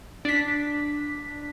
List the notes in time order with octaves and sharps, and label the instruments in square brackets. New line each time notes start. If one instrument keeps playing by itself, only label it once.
[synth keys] D4 B6